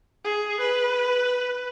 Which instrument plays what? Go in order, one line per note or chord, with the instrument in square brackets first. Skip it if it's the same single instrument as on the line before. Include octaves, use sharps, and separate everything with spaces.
[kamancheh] G#4
B4